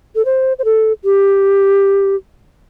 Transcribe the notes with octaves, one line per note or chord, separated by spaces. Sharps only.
A4
C5
C5
A4
G4